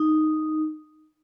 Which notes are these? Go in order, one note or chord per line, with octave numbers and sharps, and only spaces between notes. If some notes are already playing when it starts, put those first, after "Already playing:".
Already playing: D#4